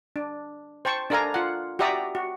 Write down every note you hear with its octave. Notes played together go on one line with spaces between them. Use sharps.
D4
C5 G5 A5 C#6
D4 A4 A#4 F5 G#5 A#5
F4 F#5
F#4 G4 D5 E5 A#5 D#6
F#4